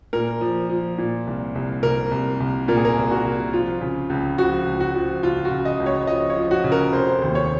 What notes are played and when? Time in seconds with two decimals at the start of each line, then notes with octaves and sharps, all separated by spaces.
0.13 A#2 A#4
0.41 F3
0.69 F3
0.98 A#2
1.27 C2
1.55 C2
1.83 C2 A#4
2.11 C2
2.40 C2
2.68 A#2 A#4
2.77 G#4
2.85 A#4
2.97 C2
3.11 F#4
3.24 C2
3.53 F3 F4
3.81 C#3
4.10 C#2
4.38 F3 F#4
4.66 C#2
4.81 F#4
4.95 F3
5.23 C#2 F4
5.45 F#4
5.51 C#3
5.65 D#5
5.80 C#2
5.86 C#5
6.07 F3 D#5
6.30 C#5
6.37 F3
6.51 F#4
6.64 C#3
6.72 A#4
6.93 F1 C5
7.22 D#2
7.35 C#5